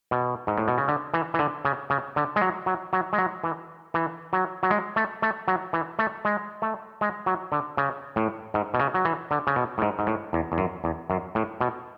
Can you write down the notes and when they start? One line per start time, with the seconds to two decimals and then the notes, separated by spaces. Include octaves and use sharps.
0.11 B2
0.47 G#2
0.58 A2
0.68 B2
0.78 C#3
0.88 D3
1.14 E3
1.34 E3
1.39 D3
1.65 C#3
1.90 C#3
2.16 D3
2.36 G#3
2.41 F#3
2.66 F#3
2.93 F#3
3.13 G#3
3.18 F#3
3.44 E3
3.94 E3
4.33 F#3
4.63 F#3
4.71 G#3
4.96 A3
5.22 A3
5.48 F#3
5.73 E3
5.99 A3
6.25 G#3
6.62 A3
7.01 G#3
7.26 F#3
7.52 D3
7.77 C#3
8.16 A2
8.54 G#2
8.74 B2
8.80 C#3
8.94 F#3
9.05 E3
9.31 D3
9.47 C#3
9.56 B2
9.78 A2
9.82 G#2
9.99 G#2
10.07 A2
10.33 E2
10.52 E2
10.58 F#2
10.84 E2
11.10 F#2
11.35 A2
11.61 B2